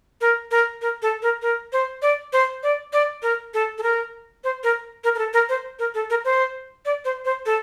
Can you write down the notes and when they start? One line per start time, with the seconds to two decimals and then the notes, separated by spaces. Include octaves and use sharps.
0.21 A#4
0.51 A#4
0.82 A#4
1.02 A4
1.22 A#4
1.42 A#4
1.73 C5
2.02 D5
2.33 C5
2.63 D5
2.93 D5
3.22 A#4
3.54 A4
3.78 A4
3.83 A#4
4.44 C5
4.63 A#4
5.04 A#4
5.15 A#4
5.18 A4
5.34 A#4
5.49 C5
5.79 A#4
5.95 A4
6.10 A#4
6.25 C5
6.85 D5
7.05 C5
7.25 C5
7.46 A4